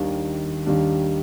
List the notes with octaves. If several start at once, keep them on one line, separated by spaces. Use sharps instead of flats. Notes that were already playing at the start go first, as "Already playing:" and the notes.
Already playing: D#2 D#3 G3 D4
D#2 D#3 G3 D4